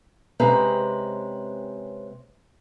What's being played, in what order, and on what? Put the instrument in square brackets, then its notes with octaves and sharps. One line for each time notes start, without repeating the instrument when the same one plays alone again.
[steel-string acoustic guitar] C3 G#3 C4 C#4 B4 A#5